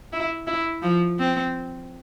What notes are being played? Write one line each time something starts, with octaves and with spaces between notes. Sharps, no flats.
E4
E4
F3
C4